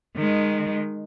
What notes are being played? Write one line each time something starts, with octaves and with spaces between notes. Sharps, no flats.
D#3 G#3